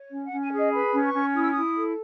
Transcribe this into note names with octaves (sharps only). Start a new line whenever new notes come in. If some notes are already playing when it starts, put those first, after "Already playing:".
Already playing: C#5
C#4
F#5
C#4
G#5
G#4 D#5
B4 B5
C#4
C#6
C#4
E4 D#6
E6
D#6
E4
A4